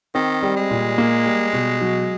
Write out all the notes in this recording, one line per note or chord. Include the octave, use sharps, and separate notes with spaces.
D#3 C4
G3
G#3
A#2
A#3
G3
B2
F#3